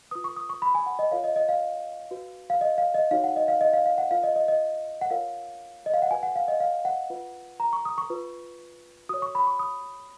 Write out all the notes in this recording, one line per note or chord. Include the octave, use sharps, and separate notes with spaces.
F4 B4 D#6
C#6
D#6
C#6
B5
G#5
F#5
D#5
F4 A#4 C#5 F5
D#5
D#5
F5
F#4 B4
F5
D#5
F5
D#5
D#4 F#4 C#5 F5
F#5
D#5
F5
D#5
F5
F5
F#5
F4 B4 F5
D#5
D#5
D#5
F#5
F4 A#4 C#5 F5
D#5
F5
F#5
F#4 B4 G#5
F#5
F5
D#5
F5
F#5
F4 B4
A#5
C#6
D#6
C#6
F4 B4
F#4 C#5 D#6
C#6
B5
C#6
D#6